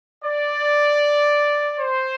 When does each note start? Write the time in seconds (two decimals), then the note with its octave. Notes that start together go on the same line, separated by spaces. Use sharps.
0.23 D5
1.79 C5